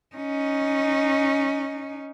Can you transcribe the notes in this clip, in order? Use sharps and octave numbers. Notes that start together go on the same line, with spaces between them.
C#4 D#4